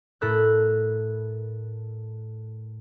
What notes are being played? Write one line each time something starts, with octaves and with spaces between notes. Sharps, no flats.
A2 A4 A#4 B5 F#6 G6